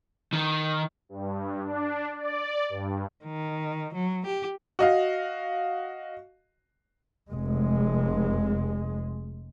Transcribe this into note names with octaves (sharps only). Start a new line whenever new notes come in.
D#3
G2
D4
D5
G2
D#3
F#3
G4
F#4 D#5 F5
F1 G#3